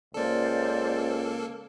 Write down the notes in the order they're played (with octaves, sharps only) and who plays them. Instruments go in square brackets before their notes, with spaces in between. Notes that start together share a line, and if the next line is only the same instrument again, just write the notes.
[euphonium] C#2 [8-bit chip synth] A#3 A4 [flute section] C5 D5